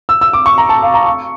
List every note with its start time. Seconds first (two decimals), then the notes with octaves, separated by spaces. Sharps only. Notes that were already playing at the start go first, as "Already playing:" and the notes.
0.09 E6
0.21 E6
0.33 D6
0.46 C#6
0.58 A#5
0.69 A5
0.82 F5
0.94 A#5
1.06 C#6